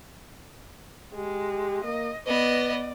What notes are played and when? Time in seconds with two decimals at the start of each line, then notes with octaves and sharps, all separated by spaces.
1.14 G#3 G4
1.84 A#3 D#5
2.26 B3 B4 D5 D#5